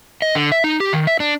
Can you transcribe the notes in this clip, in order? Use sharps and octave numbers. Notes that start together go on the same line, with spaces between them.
D#5
D3
E5
D#4
G4
D#3
E5
D4